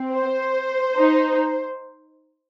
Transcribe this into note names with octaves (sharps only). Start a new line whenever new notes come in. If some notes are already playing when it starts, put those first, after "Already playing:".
Already playing: C4
C5
D#4